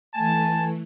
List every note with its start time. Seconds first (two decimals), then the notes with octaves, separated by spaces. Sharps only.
0.14 E3 A3 G#5 A5